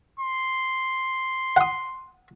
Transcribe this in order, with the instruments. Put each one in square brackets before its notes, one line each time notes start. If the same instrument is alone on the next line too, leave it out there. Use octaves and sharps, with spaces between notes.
[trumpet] C6
[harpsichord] F#5 D#6